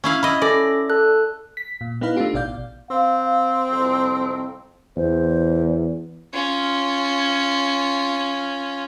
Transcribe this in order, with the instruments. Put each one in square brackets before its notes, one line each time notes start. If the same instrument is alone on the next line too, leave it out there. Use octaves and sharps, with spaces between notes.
[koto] C#4 E4 F5
[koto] E4 D#5 [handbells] B5
[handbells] C#4 A4 A#6 [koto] D5
[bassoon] A4 [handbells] F#6
[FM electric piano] B6
A#2
B3 D#4 E4 B4 F5
A3 D4 D#4 F4 G4
A1 B2 D5 F5 G6
[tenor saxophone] C4 [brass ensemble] F5
[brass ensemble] C2 F2
[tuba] E2 [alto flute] C5
[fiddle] C#4 F4